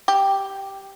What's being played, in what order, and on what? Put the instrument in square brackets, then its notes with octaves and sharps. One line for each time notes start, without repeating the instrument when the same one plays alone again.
[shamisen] G4